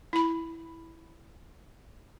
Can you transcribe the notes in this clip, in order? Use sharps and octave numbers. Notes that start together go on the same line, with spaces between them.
E4 B5